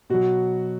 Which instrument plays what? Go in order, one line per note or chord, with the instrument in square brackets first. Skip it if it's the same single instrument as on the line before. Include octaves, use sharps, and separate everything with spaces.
[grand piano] B2 F#3 F#4